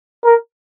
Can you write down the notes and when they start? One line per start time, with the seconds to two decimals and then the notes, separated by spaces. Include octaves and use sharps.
0.25 A#4